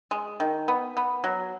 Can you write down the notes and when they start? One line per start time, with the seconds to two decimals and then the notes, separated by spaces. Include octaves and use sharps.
0.11 G#3
0.40 D#3
0.68 B3
0.97 B3
1.24 F#3